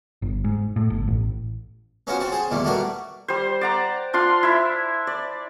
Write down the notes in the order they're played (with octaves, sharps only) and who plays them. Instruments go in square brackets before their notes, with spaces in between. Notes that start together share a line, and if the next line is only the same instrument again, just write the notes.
[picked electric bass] G1
G#2
A2
G1
A1
[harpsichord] B3 C#4 D#4 F4 F#4 C5
C4 F#4 A5
G#4 C5 A5
E2 A#2 D#3 G3 A3
G3 A3 A#3 F#4 A#4 B4
[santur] G3 C5
D5 F#5 A#5
D4 F4 C6
E4 E5
D5